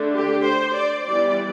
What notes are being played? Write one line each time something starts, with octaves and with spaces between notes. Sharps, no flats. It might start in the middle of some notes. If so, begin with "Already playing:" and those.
Already playing: D3 A3 D4
G4
C5
D5
E3 G3 B3 D5